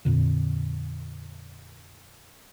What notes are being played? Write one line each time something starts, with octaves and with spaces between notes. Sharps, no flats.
F2 A#2 D3